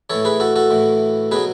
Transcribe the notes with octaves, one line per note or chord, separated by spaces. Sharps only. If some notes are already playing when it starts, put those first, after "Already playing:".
A2 E3 A4 C#5
G#4 B4
F#4 A4
F#4 A4
A2 E3
B2 F#3 G#4 B4